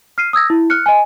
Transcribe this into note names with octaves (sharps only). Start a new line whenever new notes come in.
F6 C7 D#7
D#6 E6 G#6 A#6
E4
F6 F#6 C#7
D#5 G#5